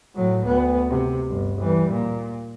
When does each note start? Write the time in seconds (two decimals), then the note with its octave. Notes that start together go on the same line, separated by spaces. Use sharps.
0.15 A2 F#3
0.45 D2 B3
0.89 C3
1.28 G1
1.61 E3 G3
1.91 A#2